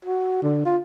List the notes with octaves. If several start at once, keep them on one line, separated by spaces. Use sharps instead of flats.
F#4
D3
F4